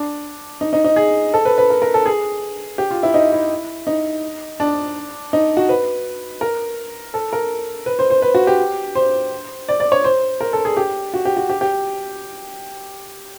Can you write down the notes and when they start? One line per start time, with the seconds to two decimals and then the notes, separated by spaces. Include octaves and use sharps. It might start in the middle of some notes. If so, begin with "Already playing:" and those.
Already playing: D4
0.61 D#4
0.73 D#4
0.84 D#4
0.96 G#4
1.34 A4
1.45 B4
1.58 B4
1.70 A#4
1.82 A#4
1.94 A4
2.06 G#4
2.78 G4
2.91 F4
3.03 E4
3.14 D#4
3.33 E4
3.87 D#4
4.60 D4
5.33 D#4
5.57 F#4
5.69 B4
6.41 A#4
7.14 A4
7.33 A#4
7.86 B4
7.99 C5
8.10 C5
8.22 B4
8.34 F#4
8.47 G4
8.95 C5
9.69 D5
9.80 D5
9.92 C#5
10.04 C5
10.41 A#4
10.53 A4
10.65 G#4
10.77 G4
11.14 F#4
11.25 G4
11.37 F#4
11.50 G4
11.61 G4